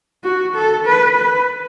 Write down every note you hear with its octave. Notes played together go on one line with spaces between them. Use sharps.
F#4
A4
B4
B4